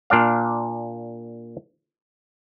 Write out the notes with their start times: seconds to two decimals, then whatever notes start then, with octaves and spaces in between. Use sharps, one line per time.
0.10 A#2 D4 D5 F5